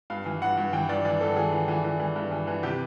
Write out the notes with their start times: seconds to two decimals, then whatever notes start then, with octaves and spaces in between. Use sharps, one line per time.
0.10 G2 F5
0.26 E3
0.42 G2 F#5
0.57 G2
0.73 E3 G5
0.89 G2 D5
1.05 E3 D5
1.21 G2 A4
1.36 E3 G#4
1.52 E3
1.68 E3
1.84 E3
2.00 E3
2.16 G2
2.31 E3
2.47 E3
2.63 C3 G4